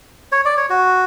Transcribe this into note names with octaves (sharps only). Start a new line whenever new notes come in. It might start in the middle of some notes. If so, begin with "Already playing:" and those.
C#5
D5
C#5
F#4